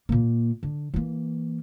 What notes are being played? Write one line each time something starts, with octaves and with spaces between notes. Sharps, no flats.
A#2 A#3
D3
E3 A#3